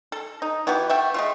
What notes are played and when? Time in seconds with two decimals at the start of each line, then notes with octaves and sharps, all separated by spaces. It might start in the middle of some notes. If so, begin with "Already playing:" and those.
0.12 A4
0.42 D#4
0.67 E3 B3 F#4 G4
0.89 A3 E5 G5
1.14 G#3 A3 F4